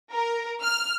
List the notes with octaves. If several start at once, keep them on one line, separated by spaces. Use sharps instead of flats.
A#4
F6